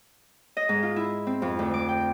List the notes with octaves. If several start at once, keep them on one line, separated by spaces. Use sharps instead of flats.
D#5
G#2
F4
E4
C4
F2
D2
D6
G5